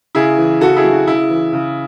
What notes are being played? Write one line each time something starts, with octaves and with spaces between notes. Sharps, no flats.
C#3 E4 G#4
E3
C#3 F#4 A4
E4 G#4
F#3
F#4
C#3 E4
E3
C#3